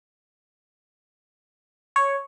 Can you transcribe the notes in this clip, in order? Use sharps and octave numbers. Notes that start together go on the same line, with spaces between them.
C#5